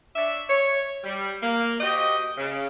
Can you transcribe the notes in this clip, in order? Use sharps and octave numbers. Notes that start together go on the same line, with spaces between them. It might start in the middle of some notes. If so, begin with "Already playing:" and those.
D4 C#5 D5 E5
C#5
G3
A#3
F#4 G4 C5 D#5
C#3